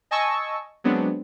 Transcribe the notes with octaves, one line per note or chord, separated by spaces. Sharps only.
D#5 G#5 A5 C#6 E6
F#3 G#3 B3 C4 D4